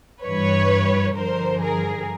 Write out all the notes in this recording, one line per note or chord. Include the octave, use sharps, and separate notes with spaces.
G2 E3 B4 C#5
G2 D3 F3 A#4 C5
G#4 A#4